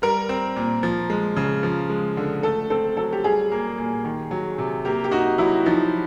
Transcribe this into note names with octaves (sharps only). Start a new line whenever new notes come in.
G3 A#4
C4
A#2
F3
G#3
C#3
F3
G#3
D3
A3 A4
C4 A4
F#3 A4
G4
G3 G#4
A#3
A#2
D#3
F#3
C3
A#3 G4
G4
D#4 F#4
F#3 E4
F3 D#4